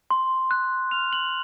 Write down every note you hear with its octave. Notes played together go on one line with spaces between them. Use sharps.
C6
F#6
F6 F7
F#7